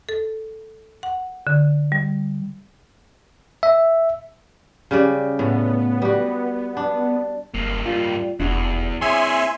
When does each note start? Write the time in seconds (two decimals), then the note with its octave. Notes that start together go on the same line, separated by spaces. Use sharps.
0.09 A4
1.03 F#5
1.47 D3
1.92 G3
3.63 E5
4.91 C#3 G3 D5
5.39 A2 B3
6.02 G3 F#4
6.77 D4
7.54 F#1 G2 A#3
7.86 G3 F4
8.40 F1 E2 D4 E4 F#4
9.01 C4 G#4 C#5 E5 G#5 C6